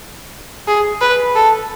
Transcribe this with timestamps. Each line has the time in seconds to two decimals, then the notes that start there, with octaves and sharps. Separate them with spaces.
0.68 G#4
1.01 B4
1.36 A4